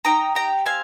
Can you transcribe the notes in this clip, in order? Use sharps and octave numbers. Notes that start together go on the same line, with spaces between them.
D#4 G5 A#5
G4 G5 A#5
C4 F5 G#5